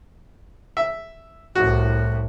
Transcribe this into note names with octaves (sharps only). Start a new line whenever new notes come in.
E5
C2 A2 F#4